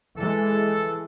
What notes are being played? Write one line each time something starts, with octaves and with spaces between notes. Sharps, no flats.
E3 G#3 A4